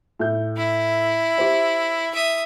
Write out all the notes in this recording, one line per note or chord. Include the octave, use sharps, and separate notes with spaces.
A2 G6
E4
G4 C5 E5
E5 D#6